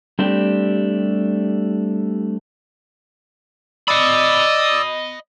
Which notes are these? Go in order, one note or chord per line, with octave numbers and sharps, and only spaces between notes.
G3 A3 C4 D4 G4
D5 D#5 B5 D#6 E6